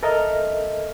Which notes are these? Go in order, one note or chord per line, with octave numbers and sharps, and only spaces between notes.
A4 A#4 D#5 E5 F6